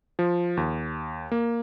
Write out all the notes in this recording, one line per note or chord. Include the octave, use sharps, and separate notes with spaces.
F3
D#2
A#3